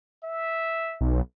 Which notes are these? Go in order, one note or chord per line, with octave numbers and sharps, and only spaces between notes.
E5
B1